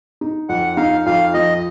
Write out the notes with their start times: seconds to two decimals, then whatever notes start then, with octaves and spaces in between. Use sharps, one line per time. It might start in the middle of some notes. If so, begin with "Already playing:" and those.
0.21 D#4
0.49 F2 F#5
0.77 D#4 F5
1.06 F2 F5
1.34 F3 D#5